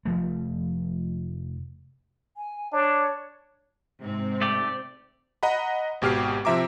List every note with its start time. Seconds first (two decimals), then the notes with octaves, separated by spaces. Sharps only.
0.05 F1 F3 A3
2.37 G#5
2.73 D4 C#5
4.01 G#2 C3 C4
4.42 A3 G4 D5
5.43 D#5 F#5 A#5 B5
6.02 G#1 B2 G4 F6 C7
6.45 C3 F3 E5 A#5 D6